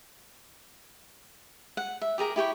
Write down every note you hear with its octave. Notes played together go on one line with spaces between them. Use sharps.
F#5
E5
G4 G#4 A#4 A#5
E4 G4 G5 C#6